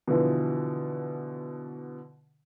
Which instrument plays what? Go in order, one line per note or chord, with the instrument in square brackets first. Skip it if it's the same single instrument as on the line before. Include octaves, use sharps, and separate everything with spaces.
[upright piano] B2 D3 E3 F3